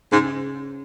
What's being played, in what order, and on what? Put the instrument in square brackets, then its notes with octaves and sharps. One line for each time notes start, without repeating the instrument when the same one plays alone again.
[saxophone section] G#2 [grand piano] C#3